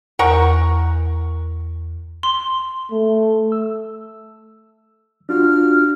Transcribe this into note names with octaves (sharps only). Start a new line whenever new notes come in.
E2 A#4 F#5 C#6
C6
A3
E6
D4 F4 F#4 F6